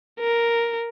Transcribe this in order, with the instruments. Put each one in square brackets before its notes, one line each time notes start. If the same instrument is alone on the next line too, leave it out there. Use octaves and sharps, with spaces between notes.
[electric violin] A#4